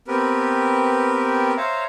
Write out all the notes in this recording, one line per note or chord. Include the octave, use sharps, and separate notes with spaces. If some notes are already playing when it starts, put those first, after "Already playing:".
B3 C4 G4 A#4 B4
C5 C#5 E5 F5 A#5